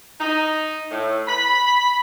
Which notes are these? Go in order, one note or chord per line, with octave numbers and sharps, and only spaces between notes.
D#4
A2
B5